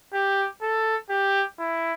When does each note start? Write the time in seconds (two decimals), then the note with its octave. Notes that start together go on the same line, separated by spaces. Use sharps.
0.13 G4
0.62 A4
1.10 G4
1.59 E4